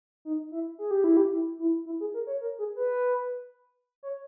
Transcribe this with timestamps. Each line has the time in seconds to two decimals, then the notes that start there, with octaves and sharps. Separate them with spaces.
0.25 D#4
0.51 E4
0.79 G#4
0.91 G4
1.04 E4
1.17 G4
1.32 E4
1.59 E4
1.86 E4
2.00 G#4
2.14 A#4
2.27 C#5
2.41 A#4
2.58 G#4
2.76 B4
4.03 C#5